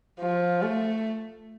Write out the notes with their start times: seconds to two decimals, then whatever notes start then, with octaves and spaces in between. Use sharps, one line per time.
0.20 F3
0.62 A3